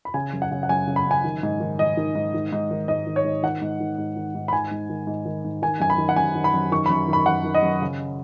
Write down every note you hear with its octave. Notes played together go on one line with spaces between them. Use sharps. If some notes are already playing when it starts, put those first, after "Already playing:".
B5
C#3 G#5
F#2
F#5
C#3
F#5
F#2 G#5
C#3
B5
F#2 G#5
D#3
G#2
D#3
G#2 D#5
D#3
G#2
D#3
G#2
D#3
G#2 D#5
D#3
C#5
G#2
D#3 F#5
G#2
D#3
G#2
D#3
G#2
B5
D#3 G#5
G#2
D#3
G#2
D#3
G#2
D#3 G#5
F#2 G#5
B5
D#3
F#5
F#2 G#5
D#3
B5
F#2
D#3 C#6
F#2 B5
D#3 B5
F#2 F#5
D#3
D#5
F#2
C#3